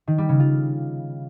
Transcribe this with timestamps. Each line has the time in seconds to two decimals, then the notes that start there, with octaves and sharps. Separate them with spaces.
0.08 D#3
0.18 G3
0.29 C#3
0.40 F4